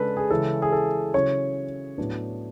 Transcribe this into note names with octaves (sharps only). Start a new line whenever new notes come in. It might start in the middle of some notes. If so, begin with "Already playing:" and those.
Already playing: C#3 G#3 D4 A4 B4
G#4
C#3 E3 G#3 C#4 E4 A4
G#4
A4
C#3 F#3 C#4 E4 C#5
A2 F#3 B3 D4